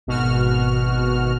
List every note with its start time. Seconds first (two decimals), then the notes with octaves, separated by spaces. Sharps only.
0.07 G#1 B2 F#4 F6